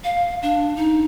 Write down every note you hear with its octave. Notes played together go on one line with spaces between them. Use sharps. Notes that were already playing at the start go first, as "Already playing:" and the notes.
F5
D4
D#4